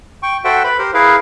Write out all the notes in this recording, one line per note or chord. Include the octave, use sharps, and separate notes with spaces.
G5 C#6
F#4 A4 C5 E5 F#5 G5
B4 B5
G4 A#4 C5
E4 G#4 A#4 B4 F5